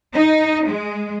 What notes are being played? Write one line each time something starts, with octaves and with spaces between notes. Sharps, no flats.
D#4
G#3